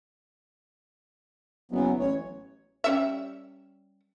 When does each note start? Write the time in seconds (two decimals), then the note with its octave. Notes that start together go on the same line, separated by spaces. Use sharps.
1.71 F#1 E3 F#3 B3
1.99 A1 C#5
2.84 G3 C#4 E5